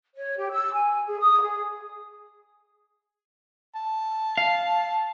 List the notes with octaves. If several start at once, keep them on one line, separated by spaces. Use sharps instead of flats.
C#5
G4
E6
G#5
G#4
D#6
G#4
A5
F5